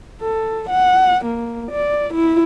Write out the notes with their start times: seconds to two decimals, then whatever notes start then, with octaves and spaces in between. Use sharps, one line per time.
0.22 A4
0.69 F#5
1.25 A#3
1.71 D5
2.14 E4